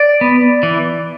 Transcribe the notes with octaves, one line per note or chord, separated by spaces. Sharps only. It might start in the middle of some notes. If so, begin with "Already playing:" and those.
Already playing: D5
B3
E3